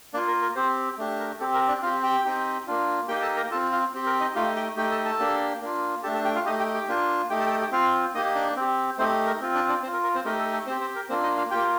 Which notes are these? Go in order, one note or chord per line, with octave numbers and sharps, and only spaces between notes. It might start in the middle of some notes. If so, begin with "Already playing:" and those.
A#3 D4 F4 D5
A#4
A#4
C4 G4 C5
A3 D4 G4
A#4
C4 G4 A4
A#4
D4 D5
C4 F4 G4 F5
G4 G5
C4 D#4 G4
A#3 D4 F4
A#3 D#4 G4 G5
A4 A5
A#4 A#5
C4 F4 A4 A5
F4 F5
C4 G4
A#4
D#4 D#5
A3 D#4 F4 G4 F5
G4 G5
A3 D#4 G4 G5
A4 A5
A4 A5
A#3 D4 G4
A#3 D4 F4
A3 D4 G4 A4 A5
A4 A5
G4 G5
F4 F5
A3 D#4 G4 D#5
G4 G5
G4 G5
A#3 D4 F4
A3 D#4 G4 G5
A4 A5
G5
A4 A5
G4 G5
C4 F4 F5
A#3 D#4 G4 D#5
D4 D5
C4 G4
A3 C4 D#4 G4 C5
A#4
C4 F4
D4 D5
D4 D5
C4 C5
F4
A#4
A#4
C4 C5
A3 D#4 G4 A#4
A4
A4
C4 G4 C5
C4 C5
A#4
A#3 C4 D4 F4 C5
D#4 D#5
F4 F5
A#3 F4 G4 G5